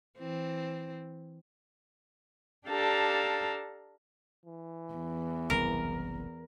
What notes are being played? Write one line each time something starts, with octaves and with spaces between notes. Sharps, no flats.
E3 C4
D4 G4 A4 F5 A5 A#5
E3
E2
F#1 C2 C#3 A#4